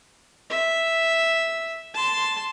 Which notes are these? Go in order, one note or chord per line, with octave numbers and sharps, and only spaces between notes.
E5
A5 C6